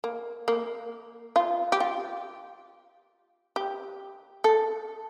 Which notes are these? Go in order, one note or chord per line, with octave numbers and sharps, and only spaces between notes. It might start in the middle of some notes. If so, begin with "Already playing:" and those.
A#3
A#3
F4
G4
F4
G4
A4